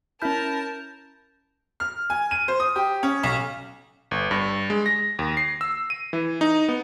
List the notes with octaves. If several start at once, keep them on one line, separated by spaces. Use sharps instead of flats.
C#4 E4 A#4 A5 B5 F6 G6
F6
G#5
D#7
C5
D#6
G4
C#4
B1
G1
G2
G#3
A#6
D#2
C7
E6
D#7
E3
D#4
B3